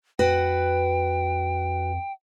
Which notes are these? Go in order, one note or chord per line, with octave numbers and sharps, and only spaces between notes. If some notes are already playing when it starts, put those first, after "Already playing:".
F2 F#4 B4 F#5 G5